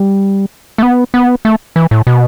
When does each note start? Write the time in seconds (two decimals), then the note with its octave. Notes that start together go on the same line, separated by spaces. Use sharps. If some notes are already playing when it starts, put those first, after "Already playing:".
Already playing: G3
0.78 A3
0.83 B3
1.14 B3
1.45 A3
1.76 E3
1.91 A2
2.07 B2